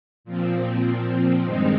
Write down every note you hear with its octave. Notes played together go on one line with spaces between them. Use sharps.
A#2 F3 C4
G2 D#3 G#3 C4 D#4